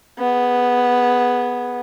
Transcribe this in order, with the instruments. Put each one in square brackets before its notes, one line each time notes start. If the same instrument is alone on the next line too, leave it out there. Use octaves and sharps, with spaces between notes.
[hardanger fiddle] B3 G#4